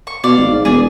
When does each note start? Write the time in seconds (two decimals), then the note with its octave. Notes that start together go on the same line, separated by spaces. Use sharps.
0.07 C#6
0.24 B2 D5 F5
0.37 G#1
0.52 G#2
0.65 E1 G#4 D5